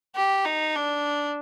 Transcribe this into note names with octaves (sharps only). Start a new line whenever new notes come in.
G4
D#4
D4